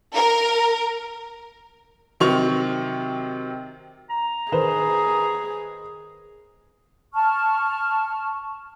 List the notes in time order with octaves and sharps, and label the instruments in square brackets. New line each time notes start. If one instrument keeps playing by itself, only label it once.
[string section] A#4
[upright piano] C3 D#3 F#3 C4 C#6 F7
[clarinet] A#5
[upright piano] D#3 B4 C5 [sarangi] G#4
[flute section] A5 C#6 F6